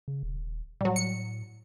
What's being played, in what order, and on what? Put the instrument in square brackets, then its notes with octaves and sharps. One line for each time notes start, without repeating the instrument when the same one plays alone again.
[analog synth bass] C#3
D#1
[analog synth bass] A2 [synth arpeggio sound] F#3 G3
[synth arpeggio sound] C#7